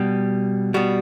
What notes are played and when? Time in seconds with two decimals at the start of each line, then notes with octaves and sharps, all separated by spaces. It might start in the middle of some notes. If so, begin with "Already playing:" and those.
Already playing: B2 G3
0.74 B2 G3 F#4